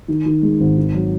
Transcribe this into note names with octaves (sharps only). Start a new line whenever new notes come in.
D#3
D#3
G#3
G#1
D#3
F#3